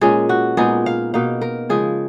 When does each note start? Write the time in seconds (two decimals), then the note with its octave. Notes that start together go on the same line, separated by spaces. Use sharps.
0.01 A#2 G#3 C#4 G#4
0.29 F#4
0.57 A#2 G#3 B3 D#4 G#4
0.86 F5
1.14 B2 A#3 D#4 F5
1.41 A#4
1.69 C#3 F3 G#3 G#4